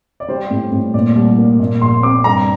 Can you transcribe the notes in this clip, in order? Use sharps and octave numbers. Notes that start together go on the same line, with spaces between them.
D5
G3 C5
A2
A2
A#2 D5
C2
A#3
A#2
A#1 C6
C4 D6
G2 A#5